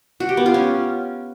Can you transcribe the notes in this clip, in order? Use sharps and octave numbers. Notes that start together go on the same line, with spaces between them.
F#4
G4
B3
F4
C#4